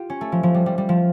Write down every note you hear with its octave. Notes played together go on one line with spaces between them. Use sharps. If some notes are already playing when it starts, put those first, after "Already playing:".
Already playing: F4 G4
C#4
A3
F3
F3
G3
G3
G3
F3